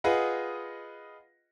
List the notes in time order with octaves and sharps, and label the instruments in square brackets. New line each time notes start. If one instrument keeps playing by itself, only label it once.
[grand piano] F4 G#4 B4 D#5 F#5